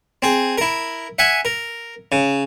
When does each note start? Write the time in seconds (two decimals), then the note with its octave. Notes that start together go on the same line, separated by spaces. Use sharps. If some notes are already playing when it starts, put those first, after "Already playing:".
0.22 C4 G#4
0.58 E4 A#4
1.19 E5 F#5 G#5
1.45 A#4
2.12 C#3